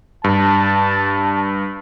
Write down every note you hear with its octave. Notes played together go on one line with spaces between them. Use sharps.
G2 A5